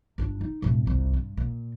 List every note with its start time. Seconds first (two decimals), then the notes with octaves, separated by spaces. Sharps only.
0.18 G1 D4
0.41 D#4
0.62 E1 A2
0.86 G1 C2
1.13 G2
1.37 A#2